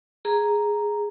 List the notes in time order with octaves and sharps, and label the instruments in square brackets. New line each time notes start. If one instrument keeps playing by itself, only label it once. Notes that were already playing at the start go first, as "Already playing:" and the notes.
[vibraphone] G#4 A#5